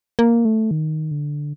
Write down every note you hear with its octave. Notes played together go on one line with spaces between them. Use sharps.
A#3
A3
D#3
D3